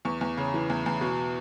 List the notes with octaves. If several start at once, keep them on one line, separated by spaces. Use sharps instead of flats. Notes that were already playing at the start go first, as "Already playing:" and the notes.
E2 C#6
E2
C#3
E3
E2
E2
B2